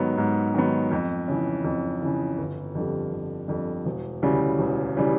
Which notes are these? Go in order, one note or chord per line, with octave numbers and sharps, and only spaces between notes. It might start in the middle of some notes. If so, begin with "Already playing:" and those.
Already playing: G#2 D#3 F#3 B3
G#2
D#3 F#3 B3
F2
C#3 E3
F2
C#3 E3
G1
F2 D3 G3
G1
F2 D3 G3
E1
D2 C#3 E3 G3
E1
C#3 E3 G3